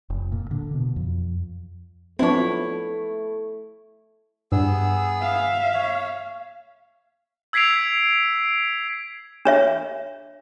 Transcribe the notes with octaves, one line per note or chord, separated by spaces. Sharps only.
F1
A#2
D3
B2
F2
F3 A3 B3 C4 D4 E4 C#5
G2 B3 G#4 E6
E5 F5
C#5
E6 G#6 B6 C7 D7 F7
D4 C#5 E5